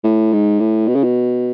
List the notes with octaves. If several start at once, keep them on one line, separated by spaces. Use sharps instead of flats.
A2
G#2
A2
B2
C#3
B2